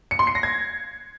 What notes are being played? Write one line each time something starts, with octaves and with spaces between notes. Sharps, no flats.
C#7
C6
C7
A#6
G#6